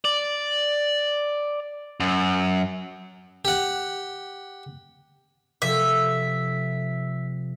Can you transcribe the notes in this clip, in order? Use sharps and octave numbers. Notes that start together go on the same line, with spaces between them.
D5
F#2
G4 F#5
C3 F3 A4 E5